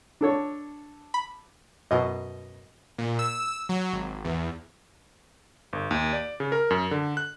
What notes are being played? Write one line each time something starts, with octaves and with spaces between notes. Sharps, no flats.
D4 A4 C#5
B5
F#2 B2 D#5
A#2
E6
F#3
G#1
E2
G1
D#2
D5
C#3
A#4
F#2
D3
F#6